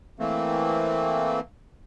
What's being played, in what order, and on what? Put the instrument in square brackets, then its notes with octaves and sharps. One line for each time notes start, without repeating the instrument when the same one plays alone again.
[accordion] E3 A3 A#3 C4